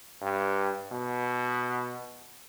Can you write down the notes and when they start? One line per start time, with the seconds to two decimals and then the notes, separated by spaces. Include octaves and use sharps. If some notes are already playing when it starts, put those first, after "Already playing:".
0.21 G2
0.92 B2